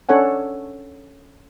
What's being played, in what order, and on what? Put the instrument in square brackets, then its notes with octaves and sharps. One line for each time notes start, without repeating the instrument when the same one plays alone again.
[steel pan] C#4 D4 A4 C#5 F#5 G#5